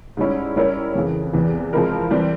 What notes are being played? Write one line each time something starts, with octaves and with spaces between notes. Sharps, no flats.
G#2 G3 C#4 E4
G3 C#4 E4 A#4 C#5
F2 C#3 E3
E2 C3 E3
F3 G#3 C4 E4 A#4
E3 G3 C4